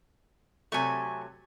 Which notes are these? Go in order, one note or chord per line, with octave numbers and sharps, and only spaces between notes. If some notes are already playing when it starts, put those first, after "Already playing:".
C3 F#3 A3 G#5 C#6